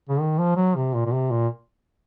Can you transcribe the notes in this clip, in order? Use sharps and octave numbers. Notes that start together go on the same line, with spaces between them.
C#3
D#3
F3
F#3
C3
A#2
A#2
C3
A#2